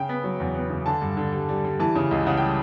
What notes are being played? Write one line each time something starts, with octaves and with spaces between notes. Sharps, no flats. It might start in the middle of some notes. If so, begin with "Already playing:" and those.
Already playing: C#3 G5
B3
F#3
E2
B3
C#3
D3 A5
G2
D3
G3
G3
G3
E3 A5
C#3
C#2
C#3 F#5
G3 G5